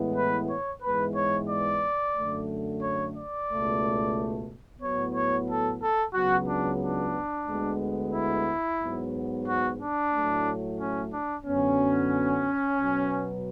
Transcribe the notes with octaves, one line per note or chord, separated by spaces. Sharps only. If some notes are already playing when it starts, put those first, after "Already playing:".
Already playing: A2 E3 G#3 B3
B4
C#5
G#2 E3 G#3 B3 B4
C#5
D5
F#2 D3 A3
C#5
D5
C#2 B2 A3
A2 F#3 B3 C#5
C#5
A4
A4
C#2 C#3 F#3 B3 F#4
D4
D4
D2 D3 G#3 B3
E4
G#2 F#3 B3
F#4
D4
A2 F#3 A3
C#4
D4
F#2 D3 F#3 B3 C#4
B2 F#3 B3